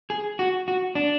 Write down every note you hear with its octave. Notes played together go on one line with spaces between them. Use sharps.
G#4
F#4
F#4
D4